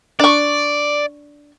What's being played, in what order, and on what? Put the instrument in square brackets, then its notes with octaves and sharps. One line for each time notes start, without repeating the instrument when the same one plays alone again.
[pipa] D4 C#6 [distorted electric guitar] D5